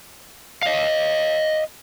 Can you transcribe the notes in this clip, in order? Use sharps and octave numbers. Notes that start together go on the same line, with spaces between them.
D#5 F5